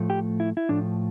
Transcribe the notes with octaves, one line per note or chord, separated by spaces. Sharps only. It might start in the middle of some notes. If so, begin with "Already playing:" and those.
Already playing: A2 F3 A3
G4
E4
E4
A2 F3 A3 D4